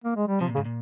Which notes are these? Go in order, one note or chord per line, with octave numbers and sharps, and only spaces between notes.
A#3
G#3
G3
C3 F3
A#2
G#2 C#3
A#2